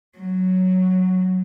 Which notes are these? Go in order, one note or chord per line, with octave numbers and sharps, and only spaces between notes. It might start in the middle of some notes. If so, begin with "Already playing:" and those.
F#3